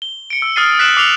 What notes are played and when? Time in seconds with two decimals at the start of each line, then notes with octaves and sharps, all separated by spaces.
0.02 G7
0.30 C#7 D7
0.42 E6
0.56 D#6 F6 A6 C7 D#7
0.79 F#6 B6 C7 D7 E7 F#7
0.97 D6 E6 C7 C#7 F7 G7